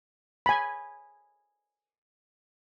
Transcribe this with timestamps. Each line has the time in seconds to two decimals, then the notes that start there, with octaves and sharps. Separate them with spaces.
0.46 G#5 B5